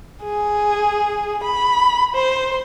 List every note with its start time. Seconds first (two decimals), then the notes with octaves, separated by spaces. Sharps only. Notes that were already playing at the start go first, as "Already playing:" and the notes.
0.23 G#4
1.44 B5
2.15 C5